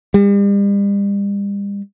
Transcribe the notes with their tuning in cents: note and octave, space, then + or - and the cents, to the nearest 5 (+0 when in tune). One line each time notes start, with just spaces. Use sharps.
G3 +40